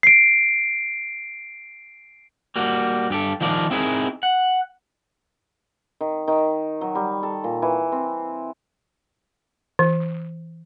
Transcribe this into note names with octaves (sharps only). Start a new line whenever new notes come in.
C7 D7
G3 A#3 F#4
G2 G4 A4
D#3 F3 F4 A#4 D5
C4 D#4 E4 G#4 A#4
F#5
D#3
D#3
F#3
G3
A4
A#2
E3
C4
E3